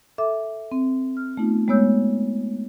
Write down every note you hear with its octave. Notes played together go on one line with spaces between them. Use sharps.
A4 E5 D6
C4
F6
A3 B3 D#4 F4
G#3 A3 B3 C#5 E6 G6